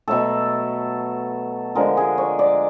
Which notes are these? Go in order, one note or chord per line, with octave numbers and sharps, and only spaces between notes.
B2 F#3 A3 A4
D3 F3 G#3 A#4
G#4
C#5
D5